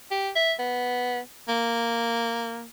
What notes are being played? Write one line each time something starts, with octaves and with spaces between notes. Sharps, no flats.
G4
E5
B3
A#3